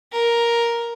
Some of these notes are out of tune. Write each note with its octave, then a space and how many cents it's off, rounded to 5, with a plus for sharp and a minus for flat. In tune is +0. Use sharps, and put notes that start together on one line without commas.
A#4 +5